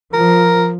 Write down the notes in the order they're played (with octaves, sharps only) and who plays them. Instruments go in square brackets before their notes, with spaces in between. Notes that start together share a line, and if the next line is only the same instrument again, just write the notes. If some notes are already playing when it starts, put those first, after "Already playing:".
[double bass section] F3 [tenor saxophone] A#4